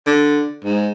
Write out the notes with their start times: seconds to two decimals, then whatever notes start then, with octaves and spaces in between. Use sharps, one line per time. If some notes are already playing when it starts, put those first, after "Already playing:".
0.06 D3
0.64 G#2